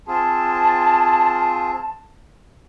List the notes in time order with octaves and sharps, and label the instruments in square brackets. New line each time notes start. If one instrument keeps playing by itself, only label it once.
[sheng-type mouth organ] C4 F4 G#4 [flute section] A5